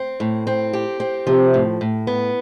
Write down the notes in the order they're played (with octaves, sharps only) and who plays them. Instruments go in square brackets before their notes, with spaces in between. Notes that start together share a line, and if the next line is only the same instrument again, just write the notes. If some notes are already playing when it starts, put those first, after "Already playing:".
Already playing: [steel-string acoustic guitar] C4
A2
C4
G4
C4
[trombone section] C3 [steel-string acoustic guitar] F3
[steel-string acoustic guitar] A2
A2
B3